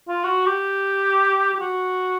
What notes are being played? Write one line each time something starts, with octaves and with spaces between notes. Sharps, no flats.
F4
F#4
G4
G4
F#4